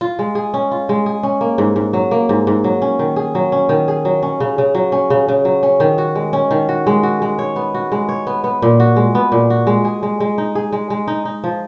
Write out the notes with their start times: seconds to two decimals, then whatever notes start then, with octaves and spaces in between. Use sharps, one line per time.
0.01 F4
0.19 G#3
0.35 G#4
0.54 C#4
0.71 F4
0.89 G#3
1.06 G#4
1.23 C#4
1.41 A#3
1.58 G#2
1.76 G#2
1.93 F#3
2.11 A#3
2.29 G#2
2.47 G#2
2.64 F#3
2.82 C#4
2.99 D#3
3.16 G#4
3.35 F#3
3.52 C#4
3.69 D#3
3.88 G#4
4.05 F#3
4.23 C#4
4.40 C#3
4.58 C#3
4.75 F#3
4.92 C#4
5.10 C#3
5.28 C#3
5.45 F#3
5.63 C#4
5.80 D#3
5.98 F#4
6.15 G#3
6.33 C#4
6.51 D#3
6.69 F#4
6.87 G#3
7.03 F#4
7.22 G#3
7.39 C#5
7.56 B3
7.74 F#4
7.92 G#3
8.09 C#5
8.27 B3
8.44 B3
8.62 A#2
8.80 F#4
8.96 G#3
9.15 B3
9.32 A#2
9.50 F#4
9.67 G#3
9.85 G#4
10.03 G#3
10.20 G#3
10.38 D#4
10.55 G#4
10.72 G#3
10.90 G#3
11.08 D#4
11.25 D#4
11.44 F3